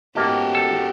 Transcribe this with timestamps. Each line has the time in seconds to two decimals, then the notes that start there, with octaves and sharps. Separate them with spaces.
0.16 G#2 A#3 B3 C#4 F#4 G4 D#5 A5
0.55 A4